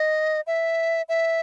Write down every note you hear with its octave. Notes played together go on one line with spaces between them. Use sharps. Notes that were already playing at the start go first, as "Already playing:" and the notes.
Already playing: D#5
E5
E5